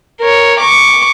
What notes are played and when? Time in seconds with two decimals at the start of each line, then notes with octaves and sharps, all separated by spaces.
0.20 A#4 C#5
0.60 C#6 D6